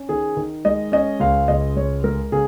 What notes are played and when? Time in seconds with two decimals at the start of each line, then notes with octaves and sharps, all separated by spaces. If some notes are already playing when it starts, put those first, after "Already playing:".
Already playing: C#4
0.09 D#3 G#4
0.37 D#3
0.65 G#3 D#5
0.92 C#4 D#5
1.20 C#2 F5
1.48 C#2 D#5
1.76 G#3 C#5
2.03 G#3 A#4
2.32 C#3 G#4